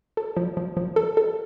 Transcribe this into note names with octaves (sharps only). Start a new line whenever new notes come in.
A4
F3
F3
F3
A4
A4